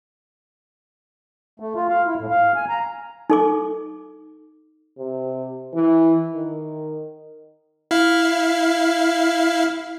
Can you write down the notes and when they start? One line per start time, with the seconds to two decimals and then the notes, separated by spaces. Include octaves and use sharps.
1.60 A3
1.76 F4
1.89 F5
2.06 E4
2.18 A2
2.31 F5
2.56 G#5
2.69 A#5
3.30 D#4 A4 D6
4.99 C3
5.74 E3
6.35 D#3
7.91 E4 F5